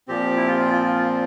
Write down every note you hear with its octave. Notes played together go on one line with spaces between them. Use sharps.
A#2 F3 C4 G4
E4
F4
F4
F4
F4